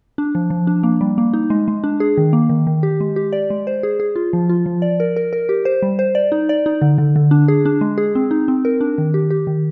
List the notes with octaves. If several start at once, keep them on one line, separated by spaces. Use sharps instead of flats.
D4
F3
F3
D4
A#3
G3
A#3
D#4
G#3
G#3
D4
G#4
D#3
A#3
D#3
D#3
G4
G#3
G4
D5
G#3
C5
G#4
G#4
F4
F3
F4
F3
D5
A#4
A#4
A#4
G4
C5
G3
C5
D5
D#4
D5
D#4
D3
D3
D3
D4
G#4
D4
G#3
G#4
C4
D#4
C4
A#4
D4
D#3
G4
G4
D#3